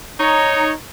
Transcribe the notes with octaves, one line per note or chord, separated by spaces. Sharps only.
D#4 C#5